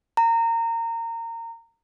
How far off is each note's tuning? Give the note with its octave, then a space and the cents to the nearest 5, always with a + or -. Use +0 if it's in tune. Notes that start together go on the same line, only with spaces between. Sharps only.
A#5 -25